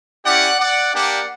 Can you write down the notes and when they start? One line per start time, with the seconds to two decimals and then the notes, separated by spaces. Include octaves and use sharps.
0.25 C#4 E4 G4 D5 F#5
0.59 D5 F#5
0.94 A#3 D4 G4 D5 F#5